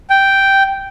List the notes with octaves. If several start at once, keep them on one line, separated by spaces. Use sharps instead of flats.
G5